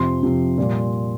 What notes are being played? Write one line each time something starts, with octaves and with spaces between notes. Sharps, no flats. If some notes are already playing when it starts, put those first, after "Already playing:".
Already playing: F2 C3 F3 C6
F2 C3 F3
A#2 G3